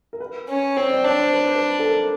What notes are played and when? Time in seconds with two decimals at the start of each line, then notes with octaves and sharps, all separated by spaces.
0.13 A#4
0.20 B4
0.49 C#4
0.77 C4 C#5
0.91 D5
1.05 D4 C#5
1.19 C5
1.33 B4
1.44 C5
1.55 B4
1.79 A4
1.90 A#4